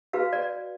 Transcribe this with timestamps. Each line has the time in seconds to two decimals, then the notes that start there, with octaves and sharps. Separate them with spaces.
0.13 F#4 B4 F5
0.33 D5